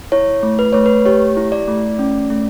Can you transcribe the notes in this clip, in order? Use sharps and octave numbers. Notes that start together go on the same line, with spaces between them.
E4 C#5
A3
B4
A3 C#5
B4
G4 C#5
E4
D5
A3
C#4
A3